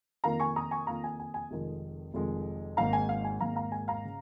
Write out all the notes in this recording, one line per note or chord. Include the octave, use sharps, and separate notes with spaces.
F2 D#3 A#3 F5 A#5
G#5 C#6
A#5 D#6
G#5 C#6
F2 D#3 A#3 F5 A#5
G#5
G#5
G#5
F1 F2 D#3 G#3
F1 F2 D#3 G#3
G#1 G#2 D#3 A#3 F5 A#5
G#5
F5
G#5
G#1 G#2 D#3 A#3 F5 A#5
F5 A#5
G#5
F5 A#5
C#3